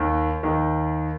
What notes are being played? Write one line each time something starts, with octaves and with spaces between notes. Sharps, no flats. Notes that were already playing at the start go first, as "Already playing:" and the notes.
Already playing: D#2 D#3
D#2 D#3